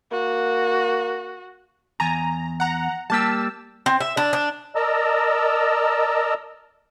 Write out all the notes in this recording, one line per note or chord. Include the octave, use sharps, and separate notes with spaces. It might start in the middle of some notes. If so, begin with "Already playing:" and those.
A#3 F#4
E2 G#5 A#5
F#5 A#5
G3 A#3 G4 A5 E6
C4
E5
D4
D4
A#4 D5 D#5 A5 A#5 E6